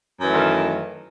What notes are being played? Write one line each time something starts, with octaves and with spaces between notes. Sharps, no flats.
F#2 D#3 E3 A3